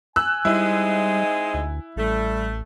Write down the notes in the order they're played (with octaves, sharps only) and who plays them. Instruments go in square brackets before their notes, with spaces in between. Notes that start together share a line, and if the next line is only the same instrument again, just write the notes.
[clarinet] G#5 [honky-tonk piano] E6 F#6
[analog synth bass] G3 [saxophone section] G#3 C4 D#4 [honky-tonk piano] E4
[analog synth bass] D2
[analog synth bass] A1 [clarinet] G3 [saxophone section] A3